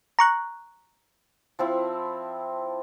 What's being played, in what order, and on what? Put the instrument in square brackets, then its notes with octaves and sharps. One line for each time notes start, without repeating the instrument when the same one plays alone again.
[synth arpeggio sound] A#5 C#6 F#6
[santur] F3 C4 E4